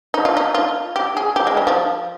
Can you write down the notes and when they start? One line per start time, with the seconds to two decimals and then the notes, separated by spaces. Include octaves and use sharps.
0.14 D#4
0.25 F4
0.37 D#4
0.54 F4
0.96 G4
1.17 G#4
1.36 G4
1.47 G#3
1.57 G3
1.67 F3